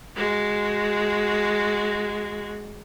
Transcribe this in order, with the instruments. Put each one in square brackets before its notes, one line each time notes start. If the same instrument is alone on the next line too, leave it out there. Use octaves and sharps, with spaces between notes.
[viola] G#3 F#4